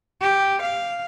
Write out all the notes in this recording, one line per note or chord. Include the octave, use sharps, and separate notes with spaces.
G4
F5